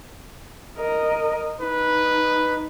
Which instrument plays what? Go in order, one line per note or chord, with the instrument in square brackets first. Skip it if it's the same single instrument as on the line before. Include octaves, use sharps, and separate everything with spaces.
[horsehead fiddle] A#4 D#5
[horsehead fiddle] D#4 [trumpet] B4